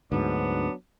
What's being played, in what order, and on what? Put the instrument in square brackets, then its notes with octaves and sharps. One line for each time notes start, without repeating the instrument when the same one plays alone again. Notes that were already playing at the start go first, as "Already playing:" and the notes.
[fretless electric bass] D2 G#2 [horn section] F#3 B3 D4